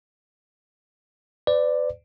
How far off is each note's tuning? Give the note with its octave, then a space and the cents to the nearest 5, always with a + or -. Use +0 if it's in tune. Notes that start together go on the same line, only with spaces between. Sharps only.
B4 +40 D5 +10